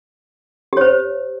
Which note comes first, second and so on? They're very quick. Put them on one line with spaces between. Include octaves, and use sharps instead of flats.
G4 C#5 C5